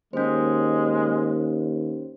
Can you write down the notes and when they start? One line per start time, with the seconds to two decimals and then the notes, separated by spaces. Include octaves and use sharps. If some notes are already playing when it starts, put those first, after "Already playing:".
0.13 D#2 G#3 C#4 C5